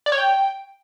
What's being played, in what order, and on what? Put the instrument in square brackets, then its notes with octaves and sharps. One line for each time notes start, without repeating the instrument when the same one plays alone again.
[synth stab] D5
C#5
G5